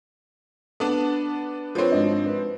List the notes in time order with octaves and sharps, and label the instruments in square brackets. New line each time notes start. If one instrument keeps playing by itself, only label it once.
[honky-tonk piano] B3 D4 [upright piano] A5
[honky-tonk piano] F3 C4 [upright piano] B4 C#5
[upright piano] G#1 D4 D#5
B4